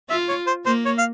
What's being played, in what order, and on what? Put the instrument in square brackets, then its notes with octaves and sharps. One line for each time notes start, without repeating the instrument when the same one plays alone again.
[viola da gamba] F4 [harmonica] E5
[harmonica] C#5
C5
[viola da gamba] A#3 [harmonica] C5
[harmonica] C#5
F5